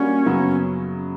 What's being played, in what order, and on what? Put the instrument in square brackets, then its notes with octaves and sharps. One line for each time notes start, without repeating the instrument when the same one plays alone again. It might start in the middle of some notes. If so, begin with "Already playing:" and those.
Already playing: [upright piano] G3 A#3 D4 F#4 [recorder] C#4
[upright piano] F#2 C#3 F#3 B3